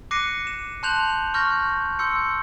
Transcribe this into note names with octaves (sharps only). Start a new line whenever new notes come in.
D6 F#6 A#6 C7 C#7 D#7
E7
A5 C6 F#6 G6 F7 F#7
C#6 F6 G6 A#6
C6 E6 G6 C#7